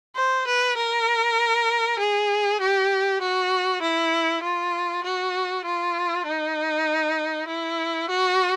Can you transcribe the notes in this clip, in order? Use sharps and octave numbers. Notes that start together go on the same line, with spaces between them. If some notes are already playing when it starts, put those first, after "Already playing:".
C5
B4
A#4
G#4
G4
F#4
E4
F4
F#4
F4
D#4
E4
F#4